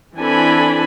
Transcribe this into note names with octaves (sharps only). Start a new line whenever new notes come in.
E3 C4 D4 A4 G#5 B5